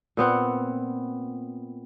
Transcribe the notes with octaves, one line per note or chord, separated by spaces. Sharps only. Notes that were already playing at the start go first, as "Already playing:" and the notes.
A#2 B3 C4 F#5